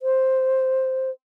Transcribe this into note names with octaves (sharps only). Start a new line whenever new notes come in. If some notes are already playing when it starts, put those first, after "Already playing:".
C5